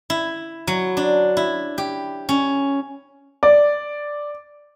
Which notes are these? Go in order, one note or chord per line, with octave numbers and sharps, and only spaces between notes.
E4
F#3
D4
E4
G4
C#4
D5